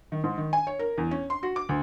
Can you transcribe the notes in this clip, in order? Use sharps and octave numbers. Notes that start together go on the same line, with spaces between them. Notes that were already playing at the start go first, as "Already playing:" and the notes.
D#3
G#2
D#3
G#5
C#5
A#4
E2
C#4
C6
F#4
D6
D2